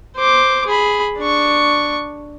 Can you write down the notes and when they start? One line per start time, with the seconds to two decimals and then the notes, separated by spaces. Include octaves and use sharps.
0.16 C5 D6
0.66 G#4 B5
1.18 D4 C#6